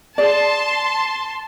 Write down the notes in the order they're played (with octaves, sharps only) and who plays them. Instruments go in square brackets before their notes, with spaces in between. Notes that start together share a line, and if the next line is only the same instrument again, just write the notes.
[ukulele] G#4 D5 [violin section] A5 C6